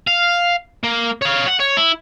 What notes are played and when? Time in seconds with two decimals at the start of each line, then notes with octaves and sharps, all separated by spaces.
0.07 F5
0.84 A#3
1.22 C#5 F5
1.48 F#5
1.60 C#5
1.77 E4